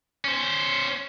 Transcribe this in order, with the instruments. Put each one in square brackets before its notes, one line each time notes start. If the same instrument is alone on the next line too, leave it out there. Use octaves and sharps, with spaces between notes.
[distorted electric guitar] C#4 C5